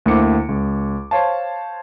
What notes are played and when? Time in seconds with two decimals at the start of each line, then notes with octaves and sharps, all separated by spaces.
0.06 D2 A#3 E4 C5 D6 C#7
0.49 C#2
1.11 C5 C#5 F5 A5